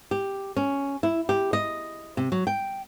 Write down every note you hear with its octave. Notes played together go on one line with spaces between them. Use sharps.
G4
C#4
E4
G4
D#5
C3
F#3
G5